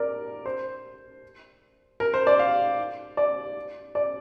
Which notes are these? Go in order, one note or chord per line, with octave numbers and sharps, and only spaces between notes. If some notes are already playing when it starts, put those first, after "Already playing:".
Already playing: A#4 D5
C5
A#4
C5
D5
F5
D5
D5